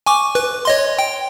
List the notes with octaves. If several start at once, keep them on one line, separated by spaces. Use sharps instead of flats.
G#5 C#6 D6
B4
C#5 D#5 C6
G5